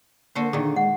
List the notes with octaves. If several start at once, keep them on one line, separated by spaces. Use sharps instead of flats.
D3 A#3 F#4 C5
A#2 D3 D#3 G#4
G#3 F#5